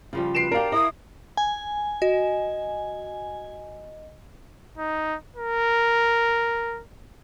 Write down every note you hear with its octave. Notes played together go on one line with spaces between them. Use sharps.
C#3 F3 G3
B4 C7 D7 E7
D4 G4 A#4 D5 F5
E4 D#5 D#6
G#5
F#4 D#5
D#4
A#4